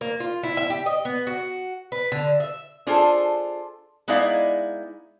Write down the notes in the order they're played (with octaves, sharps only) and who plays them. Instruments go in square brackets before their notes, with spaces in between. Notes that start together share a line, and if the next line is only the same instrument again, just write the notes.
[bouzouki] A#3
F4
E4
E5
G4
D#5
B3
F#4
B4
D3
E5
[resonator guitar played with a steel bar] D4 F4 G#4 A4 C5
G#3 B3 D#4 E4 D5 F5